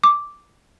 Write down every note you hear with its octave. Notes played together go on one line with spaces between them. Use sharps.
D6